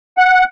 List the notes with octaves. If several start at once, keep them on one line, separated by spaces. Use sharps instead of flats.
F#5